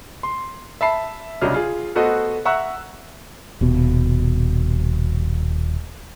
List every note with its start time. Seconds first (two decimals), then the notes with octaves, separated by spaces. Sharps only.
0.23 C6
0.81 E5 A5 B5 C7
1.41 C2 C#3 F#3 D4 D#5 F6
1.54 F4 G#4
1.95 A3 B3 F#4 A4 C5 D#5
2.45 E5 F#5 A#5 C#6 E6 F#6
3.61 D#1 B2